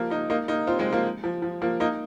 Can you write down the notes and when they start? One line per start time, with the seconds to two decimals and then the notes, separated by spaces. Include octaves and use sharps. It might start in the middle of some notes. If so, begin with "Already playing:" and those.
Already playing: F3 A#3
0.10 A#3 D#4
0.30 A#3 D#4
0.48 A#3 D#4
0.67 C4 F4
0.79 G#3 C4
0.92 F3 A#3
1.24 F3
1.42 F3
1.62 F3 A#3
1.80 A#3 D#4